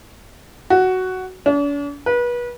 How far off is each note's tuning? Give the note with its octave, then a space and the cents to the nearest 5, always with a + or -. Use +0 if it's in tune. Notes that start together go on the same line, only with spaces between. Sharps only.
F#4 +5
D4 -45
B4 -30